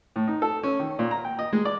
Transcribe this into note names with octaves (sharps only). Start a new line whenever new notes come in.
A2
D#4
A4
C#4
D#3
A#2
A#5
G5
D#5
G#3
D5